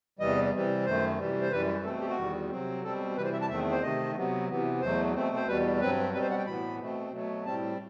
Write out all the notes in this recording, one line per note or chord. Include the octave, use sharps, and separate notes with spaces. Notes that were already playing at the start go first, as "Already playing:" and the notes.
E2 C3 E3 G3 D#5
C3 E3 G3 C4
F#2 D#3 A3 C5
C3 E3 G3
C5
F#2 E3 G3 B4
B2 A3 C4 A4
G4
F#4
E2 D#3 G3
C3 F#3 C4
B2 G3 C4 A4
C3 E3 G3 B4
C5
E5
A5
E2 D#3 A3 C4 E5
C5
C3 D#3 A3 D#5
C3 F#3 B3
C3 E3 B3
E2 B2 F#3 A3 C5
B2 A3 C4
C5
E2 B2 G3 B4
G2 F#3 C4 B4
B2 G3 C4 B4
C5
F#5
G5
A2 E3 B3 B5
B2 A3 C4
B2 F#3 A3
A2 G3 C4 A5